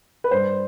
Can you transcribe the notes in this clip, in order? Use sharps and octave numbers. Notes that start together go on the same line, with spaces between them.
B4
G2 C5